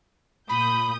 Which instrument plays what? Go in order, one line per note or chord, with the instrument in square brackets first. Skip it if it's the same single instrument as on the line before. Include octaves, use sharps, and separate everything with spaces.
[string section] A#2 D#6 G6 [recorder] B5